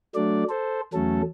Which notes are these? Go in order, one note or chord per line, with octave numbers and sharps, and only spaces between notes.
F#3 A3 D4 D5
A4 C5
E2 F#3 A3 C#4 A4